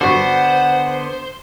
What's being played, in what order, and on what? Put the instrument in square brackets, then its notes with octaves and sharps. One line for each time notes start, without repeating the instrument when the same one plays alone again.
[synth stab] G2 F#4 C#6 [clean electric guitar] D3 B3 [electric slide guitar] C5 [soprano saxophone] F#5